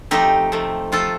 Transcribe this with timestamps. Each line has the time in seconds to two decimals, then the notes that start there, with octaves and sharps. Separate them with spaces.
0.11 C3 F3 A3 D#4 G4
0.52 C3 F3 A3
0.92 C3 F3 A3 F4 A4